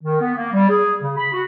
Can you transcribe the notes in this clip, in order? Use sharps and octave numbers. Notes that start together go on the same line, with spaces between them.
D#3
B3
A#3
G3
G#4
C#3
B5
F#4